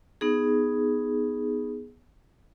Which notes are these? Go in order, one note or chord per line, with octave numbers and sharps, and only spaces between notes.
B3 D#4 G#4